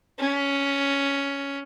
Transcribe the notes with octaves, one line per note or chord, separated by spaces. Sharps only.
C#4